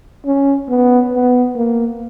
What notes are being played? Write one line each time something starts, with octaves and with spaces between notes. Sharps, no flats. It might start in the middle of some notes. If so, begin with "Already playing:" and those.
C#4
B3
B3
A#3